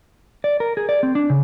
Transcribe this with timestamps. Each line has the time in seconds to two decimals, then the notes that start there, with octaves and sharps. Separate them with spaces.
0.44 D5
0.60 A#4
0.77 G#4
0.89 D5
1.03 C4
1.15 D4
1.30 C#3